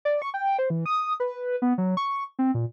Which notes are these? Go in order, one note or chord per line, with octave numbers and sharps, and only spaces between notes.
D5
C#6
G5
C5
E3
D#6
B4
B3
F#3
C#6
C4
A#2